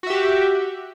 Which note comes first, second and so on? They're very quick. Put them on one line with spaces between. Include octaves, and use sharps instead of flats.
F#4 E5 G4